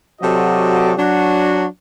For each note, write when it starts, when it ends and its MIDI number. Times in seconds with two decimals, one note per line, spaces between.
0.21 0.93 48
0.21 0.93 54
0.21 0.93 66
0.21 0.93 69
0.21 0.93 74
0.21 0.93 75
0.98 1.65 54
0.98 1.65 62
0.98 1.65 66